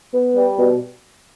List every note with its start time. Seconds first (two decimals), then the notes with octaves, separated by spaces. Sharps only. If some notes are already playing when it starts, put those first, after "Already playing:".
0.14 B3
0.36 G3
0.59 B2